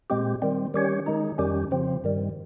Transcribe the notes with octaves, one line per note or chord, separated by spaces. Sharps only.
A#2 G#3 C4 G4
D#3 G3 C4
D#3 G3 C#4 G4 C#5
D#3 G#3 D#4
F2 D#3 G3 C#4 G4
C#3 F3 C4
G2 D#3 G3